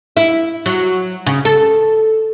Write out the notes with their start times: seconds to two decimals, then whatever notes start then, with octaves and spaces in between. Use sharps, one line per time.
0.17 E4
0.66 F#3
1.26 C#3
1.45 A4